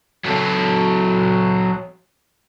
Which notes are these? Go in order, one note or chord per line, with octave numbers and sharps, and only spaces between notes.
F#3 A4